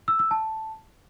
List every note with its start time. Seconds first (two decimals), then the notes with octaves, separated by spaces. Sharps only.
0.08 E6
0.19 E6
0.31 A5